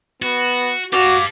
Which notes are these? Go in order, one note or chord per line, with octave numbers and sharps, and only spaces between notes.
B3 F#4
F#4 G4 D5 F5 A5